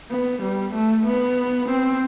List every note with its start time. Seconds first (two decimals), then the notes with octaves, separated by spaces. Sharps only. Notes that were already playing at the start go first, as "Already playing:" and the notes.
0.10 B3
0.42 G3
0.73 A3
1.05 B3
1.68 C4